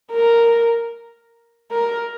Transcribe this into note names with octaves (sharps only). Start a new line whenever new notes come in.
A#4
A#4